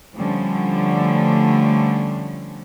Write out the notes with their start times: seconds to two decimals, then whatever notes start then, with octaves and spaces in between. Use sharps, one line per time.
0.15 D3 F3 G3 A3 C#4